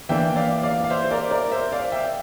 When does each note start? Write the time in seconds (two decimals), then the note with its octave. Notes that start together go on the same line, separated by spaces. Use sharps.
0.09 E3 A#3 D4 E5 G5
0.36 D5 F5
0.63 D5 F5
0.84 F5
0.90 C5 E5
1.04 C5
1.11 A#4 D5
1.31 A#4 D5
1.52 C5 E5
1.72 D5 F5
1.92 E5 G5